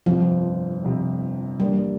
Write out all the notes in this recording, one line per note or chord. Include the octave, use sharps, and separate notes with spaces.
G1 F2 C3 F3
G1 F2 C3
E2 E3 G3 A#3 D4